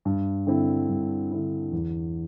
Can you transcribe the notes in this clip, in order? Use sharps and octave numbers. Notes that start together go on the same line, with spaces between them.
G2
D3 C4 E4
G2
D3 C4 E4
E2